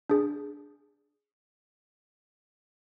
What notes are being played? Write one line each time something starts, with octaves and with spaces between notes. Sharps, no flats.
D4 G#4